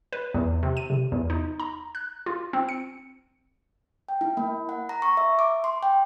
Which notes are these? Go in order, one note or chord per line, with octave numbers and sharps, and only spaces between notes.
B4
E2
C3
D#7
C3
E2
D#4
A#5
F#6
F4
C4
C#7
G5
E4
A#3
F#5
A#5
C#6
E5
D6
C6
G5